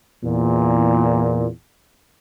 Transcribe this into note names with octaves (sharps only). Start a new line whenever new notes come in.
E2 A#2